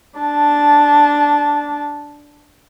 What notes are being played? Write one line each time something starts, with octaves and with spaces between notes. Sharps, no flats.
D4 A5